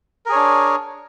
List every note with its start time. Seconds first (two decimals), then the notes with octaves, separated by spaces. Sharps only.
0.26 A#4
0.29 G#4
0.32 C#5
0.35 D4